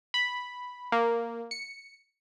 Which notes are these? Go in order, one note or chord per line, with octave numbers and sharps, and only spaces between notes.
B5
A#3
C#7